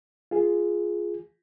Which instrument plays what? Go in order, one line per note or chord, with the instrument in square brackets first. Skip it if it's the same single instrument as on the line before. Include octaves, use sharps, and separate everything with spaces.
[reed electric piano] F4 G#4